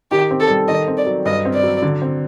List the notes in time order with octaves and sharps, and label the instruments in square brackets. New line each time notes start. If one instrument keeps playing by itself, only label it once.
[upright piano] D#3 [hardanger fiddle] G4
[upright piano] C4
[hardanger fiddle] A4
[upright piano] G3
[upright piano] D#3 [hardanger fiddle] D#5
[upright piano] C4
[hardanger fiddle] D5
[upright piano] F#3
[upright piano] G2 [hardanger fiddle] D#5
[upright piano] C4
[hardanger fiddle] D5
[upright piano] F#3
D3
C4